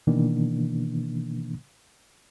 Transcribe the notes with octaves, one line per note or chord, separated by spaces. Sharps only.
B2 D#3 E3 A#3 D4